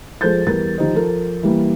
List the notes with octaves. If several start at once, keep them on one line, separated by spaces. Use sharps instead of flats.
F3 G#3 A4 C5 G6 A6
E2 G3 A#4 A6
D#3 F3 D#4 G4 C5 D#5
F3 A4 A#4
E3 G3 A#3